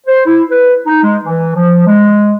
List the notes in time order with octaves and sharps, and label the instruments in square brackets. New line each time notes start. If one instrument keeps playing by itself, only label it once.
[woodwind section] C5
E4
B4
D#4
G#3
E3
F3
G#3